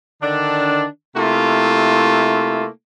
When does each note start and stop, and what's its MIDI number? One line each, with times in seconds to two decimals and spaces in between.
0.22 0.86 50
0.22 0.86 51
0.22 0.86 62
1.16 2.67 48
1.16 2.67 57
1.16 2.67 58
1.16 2.67 64
1.16 2.67 65